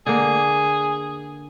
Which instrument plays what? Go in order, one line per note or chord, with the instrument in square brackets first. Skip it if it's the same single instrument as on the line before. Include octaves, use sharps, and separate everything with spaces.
[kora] D3 A#3 [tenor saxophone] G#4